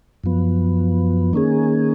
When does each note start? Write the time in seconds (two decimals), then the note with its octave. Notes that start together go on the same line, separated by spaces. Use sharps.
0.24 F#2 F3 B3
1.33 D#3 A#3 C#4 G#4